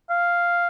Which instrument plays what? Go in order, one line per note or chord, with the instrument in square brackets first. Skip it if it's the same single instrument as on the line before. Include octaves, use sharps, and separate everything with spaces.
[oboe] F5